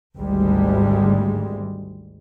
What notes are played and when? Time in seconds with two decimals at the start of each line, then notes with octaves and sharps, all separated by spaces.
0.17 G#1 D2 G3 G#3